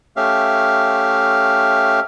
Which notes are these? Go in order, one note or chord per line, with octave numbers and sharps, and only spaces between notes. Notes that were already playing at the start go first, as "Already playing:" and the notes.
A3 C#4 G4 E5 F5